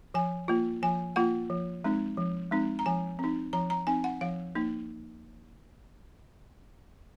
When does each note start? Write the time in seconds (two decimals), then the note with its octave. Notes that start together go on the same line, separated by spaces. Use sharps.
0.14 F3 G#5
0.48 A#3 F4
0.82 F3 G#5
1.16 A#3 F4 F#5
1.50 F3
1.84 G#3 C4 D#4
2.17 F3
2.51 G#3 C4 D#4
2.79 A#5
2.86 F3 G#5
3.19 C4 D#4
3.53 F3 A#5
3.70 A#5
3.87 C4 D#4 G#5
4.04 F#5
4.21 F3 F5
4.55 A#3 D#4